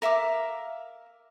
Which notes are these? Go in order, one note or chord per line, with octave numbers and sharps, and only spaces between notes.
A#4 E5 F5 D6